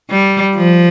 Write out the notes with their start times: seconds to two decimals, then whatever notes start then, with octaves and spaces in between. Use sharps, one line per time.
0.10 G3
0.55 F3